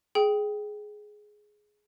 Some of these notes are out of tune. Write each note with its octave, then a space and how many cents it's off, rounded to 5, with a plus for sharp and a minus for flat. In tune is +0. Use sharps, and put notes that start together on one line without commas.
G#4 +10 G5 +0